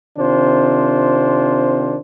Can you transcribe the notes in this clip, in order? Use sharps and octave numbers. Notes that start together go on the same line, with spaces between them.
C3 D#3 C4 D4 F4 C5